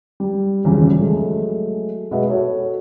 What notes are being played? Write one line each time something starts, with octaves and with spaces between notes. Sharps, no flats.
G3
G#1 E2 G2 C#3 F3
F#3 G#3 A3
B2 G#3 B3 F#4 E5
F#4 A4 C#5